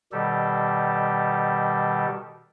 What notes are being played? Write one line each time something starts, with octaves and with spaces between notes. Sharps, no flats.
B2 D#3 G3 G4 A4